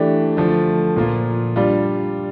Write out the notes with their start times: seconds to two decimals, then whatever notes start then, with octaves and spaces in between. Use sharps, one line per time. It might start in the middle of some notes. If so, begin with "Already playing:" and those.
Already playing: E3 A3 D4 G4
0.37 D3 F3 A3
0.97 A#2 F3 A#3 F4
1.56 G3 D4 F4